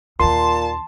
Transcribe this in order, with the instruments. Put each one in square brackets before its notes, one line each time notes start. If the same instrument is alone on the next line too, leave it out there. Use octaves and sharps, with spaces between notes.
[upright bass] D#2 D#3 [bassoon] A#2 [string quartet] A5 [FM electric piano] C6